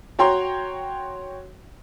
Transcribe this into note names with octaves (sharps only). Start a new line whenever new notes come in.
F#4 C#5 G5 A#5 C6